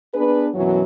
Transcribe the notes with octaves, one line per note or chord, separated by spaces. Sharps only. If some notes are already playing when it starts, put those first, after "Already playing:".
B3 D4 G#4 B4
F#2 B2 E3 F#3